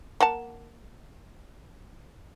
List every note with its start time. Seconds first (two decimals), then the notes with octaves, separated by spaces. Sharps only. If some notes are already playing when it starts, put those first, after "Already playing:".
0.20 A#3 F#5 A5